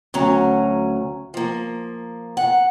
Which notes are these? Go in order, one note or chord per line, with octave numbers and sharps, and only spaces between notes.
D2 F#3 C#4 A#5
F3 A#3
F#5